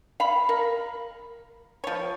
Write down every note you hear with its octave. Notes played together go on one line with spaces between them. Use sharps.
F5 B5
A#4
F3 C#5